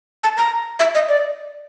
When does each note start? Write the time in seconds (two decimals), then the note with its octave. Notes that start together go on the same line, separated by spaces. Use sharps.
0.24 A5
0.37 A#5
0.79 E5
0.95 D#5
1.09 D5